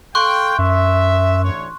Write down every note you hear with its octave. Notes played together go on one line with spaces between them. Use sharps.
A4 F5 G5 C6 C#6 F#6
F#2 E5
A1 D2 C#5